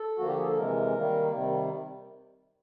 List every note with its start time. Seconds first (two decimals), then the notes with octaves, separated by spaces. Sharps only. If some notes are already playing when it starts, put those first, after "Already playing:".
Already playing: A4
0.17 D3 F3 A#3 F#4
0.27 G4
0.37 G#4
0.47 A4
0.56 C3 E3 G#3 A#4
0.95 D#3 G3 A#3
1.31 C3 D#3 G3